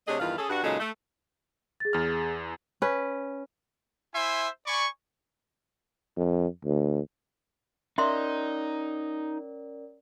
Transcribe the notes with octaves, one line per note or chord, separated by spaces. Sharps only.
C3 A3 D4 G#4 C#5 D#5
E2 G2 D#3 E3 F4 F5
C#4 G#4 A4
G2 F#4
A#2 C#3 F#3 G#3 D#4 A4
A3
G#4 A6
E2 F6
C#4 B4
E4 C5 E5 G#5 C6
D5 G#5 B5 C#6
F2
D2
C#4 D#4 A#4 D5 E5 C6